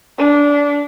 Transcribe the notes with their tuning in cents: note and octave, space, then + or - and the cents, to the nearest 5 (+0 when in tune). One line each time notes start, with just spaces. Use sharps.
D4 -20